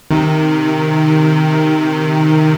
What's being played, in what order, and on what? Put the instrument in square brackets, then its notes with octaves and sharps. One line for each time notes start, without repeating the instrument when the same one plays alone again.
[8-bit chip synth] C3 D#3